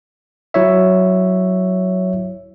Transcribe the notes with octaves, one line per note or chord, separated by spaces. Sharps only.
F#3 E4 C#5 E5